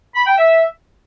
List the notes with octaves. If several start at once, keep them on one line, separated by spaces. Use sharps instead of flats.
B5
G5
E5